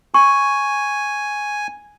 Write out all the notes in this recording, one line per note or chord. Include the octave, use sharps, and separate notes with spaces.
G#5 C#6